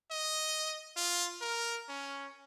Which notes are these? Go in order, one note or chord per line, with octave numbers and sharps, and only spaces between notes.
D#5
F4
A#4
C#4